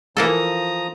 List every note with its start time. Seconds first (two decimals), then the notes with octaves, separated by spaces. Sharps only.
0.17 E3 F3 A#3 A4 A#5 D#6